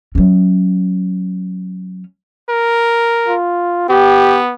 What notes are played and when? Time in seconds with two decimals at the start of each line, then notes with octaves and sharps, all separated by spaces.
0.15 F#3 C#4
2.49 A#4
3.28 F4
3.89 B3 G4